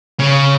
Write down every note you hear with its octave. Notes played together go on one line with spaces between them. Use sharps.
C#3